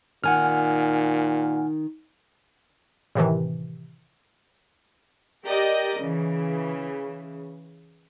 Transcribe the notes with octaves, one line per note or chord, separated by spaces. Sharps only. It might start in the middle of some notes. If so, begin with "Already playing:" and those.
A#2 D#3 F#5 G#5 F6
A2 C3 D#3 E3
G4 A#4 D5 D#5
C#3 E3